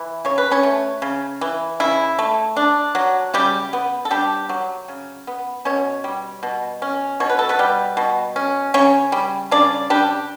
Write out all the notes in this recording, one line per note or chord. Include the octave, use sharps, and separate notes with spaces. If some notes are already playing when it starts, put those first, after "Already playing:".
Already playing: E3
C#3 C#5
B4
C#4 C#5
A3
C#3
E3
C#3 E4
A3
D4
F#3
C#3 G3 G4
B3
A4
G3 D4 G4
F#3
C#3
B3
B2 C#4 C#5
G3
B2
C#4
B2 C#5
B4
A4
B3 B4
G3
B2
C#4
C#3 C#4 C#5
G3
C#3 D4 D5
G3 D4 G4